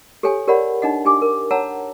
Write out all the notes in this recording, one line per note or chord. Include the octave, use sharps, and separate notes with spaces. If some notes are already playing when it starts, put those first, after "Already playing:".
G4 A4 C#5 G5 G#5
G4 A#4 C#5 D5 F#5 B5
D4 D#4 D#5 F#5
D4 G4 G#5 D6
A#4
C#5 F#5 A5 A#5 E6